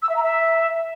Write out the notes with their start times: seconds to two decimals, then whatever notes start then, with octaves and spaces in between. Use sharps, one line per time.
0.02 E6
0.09 E5
0.16 A#5
0.23 E5